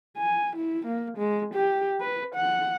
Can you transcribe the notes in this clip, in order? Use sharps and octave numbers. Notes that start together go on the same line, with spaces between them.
G#5
E4
A#3
G#3
G4
B4
F#5